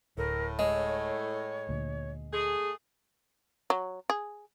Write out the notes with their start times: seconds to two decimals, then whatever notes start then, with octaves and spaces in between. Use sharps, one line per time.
0.18 D1 A2 A#4
0.59 G#3 C#5
1.69 D2 A#2
2.33 A3 G#4
3.70 F#3
4.10 G#4